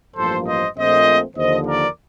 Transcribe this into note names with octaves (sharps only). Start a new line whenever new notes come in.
A1 G2 F3 A#3 A4 C5
C5 D#5
A#1 A#2 A3 C4 C5 D#5
D#2 D3 F3 C5 D#5
A#4 D5